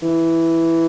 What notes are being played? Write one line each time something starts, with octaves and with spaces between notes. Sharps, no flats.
E3